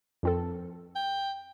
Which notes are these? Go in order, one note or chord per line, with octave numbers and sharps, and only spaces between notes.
F2 C4 A4
G5